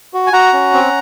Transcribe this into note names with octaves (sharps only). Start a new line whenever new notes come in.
F#4
G#5
F#4 F#5 A#5
C#4
C4